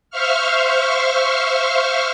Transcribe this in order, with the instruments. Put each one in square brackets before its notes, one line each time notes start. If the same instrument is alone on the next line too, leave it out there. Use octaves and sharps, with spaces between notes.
[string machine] C5 E5 F5 C#6 F6